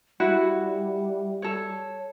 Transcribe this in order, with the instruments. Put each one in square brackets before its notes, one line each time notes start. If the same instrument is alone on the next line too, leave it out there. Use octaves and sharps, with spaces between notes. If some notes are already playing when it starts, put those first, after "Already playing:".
[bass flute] G3 [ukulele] E4 F#4 F#5
[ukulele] A4 C#5